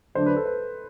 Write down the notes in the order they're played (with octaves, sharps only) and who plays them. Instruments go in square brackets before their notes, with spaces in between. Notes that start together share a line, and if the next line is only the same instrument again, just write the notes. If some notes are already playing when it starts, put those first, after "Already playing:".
[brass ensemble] D3 F#3 A3 D4 [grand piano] C5
[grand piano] B4
A4
B4